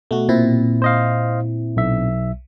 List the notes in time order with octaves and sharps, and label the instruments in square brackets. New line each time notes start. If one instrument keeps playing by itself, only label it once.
[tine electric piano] B2 [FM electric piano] A3 F#4
[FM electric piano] A#2 C4 E4
[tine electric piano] C5 D#5 F5
B1 E5